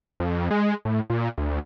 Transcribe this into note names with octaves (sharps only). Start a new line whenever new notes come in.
F2
G#3
A2
A#2
D2